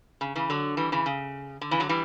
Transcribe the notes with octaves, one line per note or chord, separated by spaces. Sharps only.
C#3
C#3 E3
D3 F#3
E3 G3
C#3 E3
C#3
D3
C#3 E3
D3 F#3
E3 G3